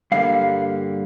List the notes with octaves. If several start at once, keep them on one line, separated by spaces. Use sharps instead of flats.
G2 D3 G3 A#3 F5